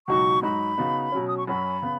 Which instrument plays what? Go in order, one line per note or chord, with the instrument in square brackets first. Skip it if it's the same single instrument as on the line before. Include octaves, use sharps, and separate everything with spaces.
[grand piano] C#2 B2 F#3 D#4 F#4 [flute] C#6
[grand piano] G#2 F#3 D#4 F#4 [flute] B5
[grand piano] C#3 B3 D#4 F#4
B2 F#3 C#4
[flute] D#6
C#6
[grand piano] F#2 F#3 C#4 F#4 [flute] B5
[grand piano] C#3 B3